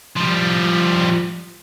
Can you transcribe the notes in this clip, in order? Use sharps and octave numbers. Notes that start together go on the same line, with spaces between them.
F3 G3